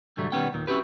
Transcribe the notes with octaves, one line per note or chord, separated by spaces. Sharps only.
C2 G#2 D3 F#3 G3 A3
B1 D#3 G3 B3 C#4 G5
D#2 A#2 D#3
C#4 E4 F#4 G4 B4